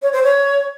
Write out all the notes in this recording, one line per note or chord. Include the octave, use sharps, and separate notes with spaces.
C#5
C5
C#5